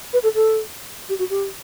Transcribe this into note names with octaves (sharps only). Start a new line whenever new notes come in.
B4
A4
A4
G4
F#4
G4